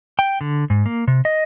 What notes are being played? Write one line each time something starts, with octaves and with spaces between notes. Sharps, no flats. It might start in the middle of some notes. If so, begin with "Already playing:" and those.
G5
D3
G#2
A#3
C3
D#5